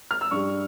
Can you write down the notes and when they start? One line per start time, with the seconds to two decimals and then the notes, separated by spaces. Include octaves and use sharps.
0.11 F6
0.21 E6
0.31 G2 G3 C#6